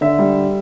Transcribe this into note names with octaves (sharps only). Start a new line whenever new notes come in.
D3 E5
G3